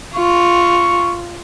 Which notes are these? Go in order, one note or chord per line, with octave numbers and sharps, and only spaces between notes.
F4 C#6